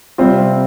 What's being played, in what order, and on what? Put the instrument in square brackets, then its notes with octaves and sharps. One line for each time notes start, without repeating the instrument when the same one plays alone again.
[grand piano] C3 G3 C4 F4